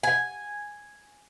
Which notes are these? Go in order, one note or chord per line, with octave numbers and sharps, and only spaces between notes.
G#5